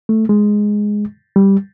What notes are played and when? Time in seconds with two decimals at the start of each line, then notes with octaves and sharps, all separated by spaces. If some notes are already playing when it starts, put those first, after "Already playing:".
0.09 A3
0.29 G#3
1.36 G3